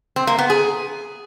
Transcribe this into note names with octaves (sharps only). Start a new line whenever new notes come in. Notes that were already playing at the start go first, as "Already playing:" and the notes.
C4
A#3
B3
G#4